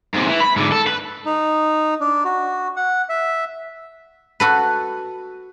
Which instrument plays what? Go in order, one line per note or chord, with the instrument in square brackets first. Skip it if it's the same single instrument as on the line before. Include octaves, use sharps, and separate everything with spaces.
[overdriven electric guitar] G#2 C3
E3
B5
G#2 D3
A4
B4
[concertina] D#4
D4
F#4
F#5
E5
[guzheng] F#4 A4 B4